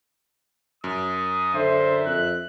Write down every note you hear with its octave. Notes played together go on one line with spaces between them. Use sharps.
F#2 D#6
D3 C5 E5
F2 F#6